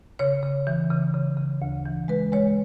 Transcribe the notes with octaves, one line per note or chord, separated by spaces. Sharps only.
C#3 C#5
C#3
E3
C#3
C#3
C#3
D2
E3
G#3 B4
G#3 C#5